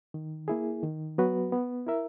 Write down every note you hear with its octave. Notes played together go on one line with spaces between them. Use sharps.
D#3
A#3 E4 G#4
D#3
F#3 B3 F#4 B4
B3
E4 A#4 E5